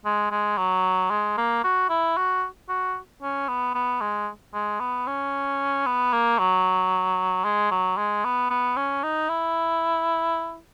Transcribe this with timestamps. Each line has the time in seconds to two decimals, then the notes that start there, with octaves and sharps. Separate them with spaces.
0.05 G#3
0.31 G#3
0.58 F#3
1.11 G#3
1.38 A#3
1.64 F#4
1.89 E4
2.17 F#4
2.69 F#4
3.22 C#4
3.48 B3
3.75 B3
4.01 G#3
4.54 G#3
4.80 B3
5.07 C#4
5.86 B3
6.13 A#3
6.39 F#3
7.45 G#3
7.71 F#3
7.97 G#3
8.24 B3
8.50 B3
8.77 C#4
9.03 D#4
9.29 E4